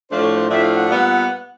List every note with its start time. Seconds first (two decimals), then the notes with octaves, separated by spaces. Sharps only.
0.10 A2 F3 A3 D4 C5
0.23 C#5
0.36 C5
0.49 A2 F3 A3 D4 E5
0.62 F5
0.75 F#5
0.88 A#2 G3 B3